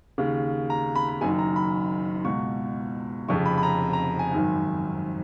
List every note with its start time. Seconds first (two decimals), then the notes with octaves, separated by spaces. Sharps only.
0.18 D#2 C#3
0.70 A#5
0.95 B5
1.08 B5
1.21 F#1 F#2 D#3 G#5
1.39 A#5
1.56 B5
2.25 C#2 B2 C#6
3.28 F1 F2 C#3 C#6
3.45 B5
3.58 B5
3.63 A#5
3.93 A#5
4.19 G#5
4.31 G#1 F#2 D#3